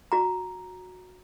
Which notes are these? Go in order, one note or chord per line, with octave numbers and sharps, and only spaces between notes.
F#4 A#5